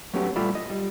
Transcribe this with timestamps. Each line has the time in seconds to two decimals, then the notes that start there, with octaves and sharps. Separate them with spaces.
0.13 F#3 A3 B3 C#4 F#4 G4
0.36 A#2 G3 A3 F4 D5 B5
0.55 D#5
0.70 G3